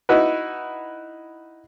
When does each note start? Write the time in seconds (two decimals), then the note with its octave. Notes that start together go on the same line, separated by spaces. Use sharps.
0.09 D#4 E4 F#4 B4